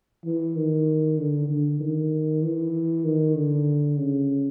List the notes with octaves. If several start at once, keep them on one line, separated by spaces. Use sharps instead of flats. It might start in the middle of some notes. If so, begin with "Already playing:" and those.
E3
D#3
D3
D3
D#3
E3
D#3
D3
C#3